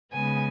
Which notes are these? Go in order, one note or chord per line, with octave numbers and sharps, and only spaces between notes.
C#3 G#3 B3 G#5